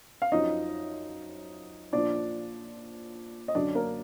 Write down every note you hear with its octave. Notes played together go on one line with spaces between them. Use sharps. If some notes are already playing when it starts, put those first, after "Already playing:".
F5
F#2 F3 D#4 D#5
A#2 F3 D4 D5
D#5
F#2 D3 F#3 D4 D5
A#3 A#4